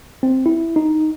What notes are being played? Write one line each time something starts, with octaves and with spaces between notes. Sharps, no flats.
C4
E4
D#4